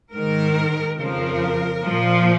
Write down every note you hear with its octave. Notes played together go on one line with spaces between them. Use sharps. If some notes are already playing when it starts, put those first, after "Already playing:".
G#2 D#3 A#4
F2 C#3 F3 A#4
F3
A#2